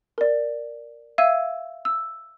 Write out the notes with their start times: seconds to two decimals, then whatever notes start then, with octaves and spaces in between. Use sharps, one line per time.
0.18 A#4 D5
1.18 E5 F5 E6 G#6 D#7
1.85 E6